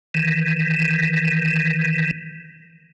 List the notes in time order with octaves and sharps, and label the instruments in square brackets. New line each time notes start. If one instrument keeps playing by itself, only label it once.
[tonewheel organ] D#3 E3